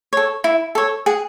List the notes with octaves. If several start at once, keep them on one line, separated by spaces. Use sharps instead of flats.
A4 C#5
E4
A4 C#5
G#4 F#5